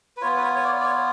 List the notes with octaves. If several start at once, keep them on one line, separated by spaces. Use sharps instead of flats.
B4
B3 F4 C#5
B4
C#5
C#5
D5
D5
C#5